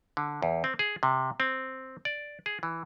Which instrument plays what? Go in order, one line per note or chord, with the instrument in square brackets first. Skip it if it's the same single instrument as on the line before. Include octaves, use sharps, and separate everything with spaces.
[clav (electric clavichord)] D3
E2
C4
G#4
C3
C4
D5
G#4
E3